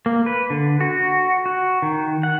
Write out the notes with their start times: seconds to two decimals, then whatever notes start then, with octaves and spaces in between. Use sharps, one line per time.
0.06 A#3
0.26 B4
0.50 D3
0.81 F#4
1.46 F#4
1.82 D#3
2.23 F#5